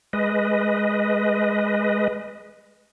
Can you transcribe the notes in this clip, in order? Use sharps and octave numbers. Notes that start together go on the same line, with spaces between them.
G#3 B4 D#5